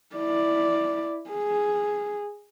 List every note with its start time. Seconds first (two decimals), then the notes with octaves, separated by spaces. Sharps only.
0.15 E4 D5
1.30 G#4